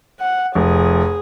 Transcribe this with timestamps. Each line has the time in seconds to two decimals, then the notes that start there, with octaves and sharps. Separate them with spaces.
0.20 F#5
0.55 F1 G#4